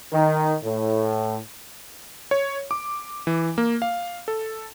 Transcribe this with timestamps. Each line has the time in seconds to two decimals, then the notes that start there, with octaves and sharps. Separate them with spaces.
0.13 D#3
0.64 A2
2.31 C#5
2.71 D6
3.27 E3
3.58 A#3
3.82 F5
4.28 A4